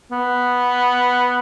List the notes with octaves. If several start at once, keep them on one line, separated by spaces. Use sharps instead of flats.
B3